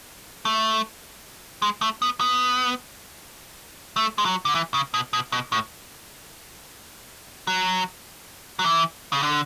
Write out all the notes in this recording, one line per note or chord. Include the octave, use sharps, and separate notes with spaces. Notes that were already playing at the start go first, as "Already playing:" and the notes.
A3
G#3
A3
B3
B3
A3
G#3
F#3
D3
E3
C#3
B2
B2
B2
A2
F#3
F#3
E3
C#3
D3